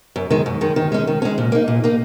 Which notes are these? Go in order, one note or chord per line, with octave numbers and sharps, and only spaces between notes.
F#2
D#3 G#3
F#2
D#3 G#3
D#3
G#3 C#4
D#3
G#3 C#4
A#2
A#3 D#4
A#2
A#3 D#4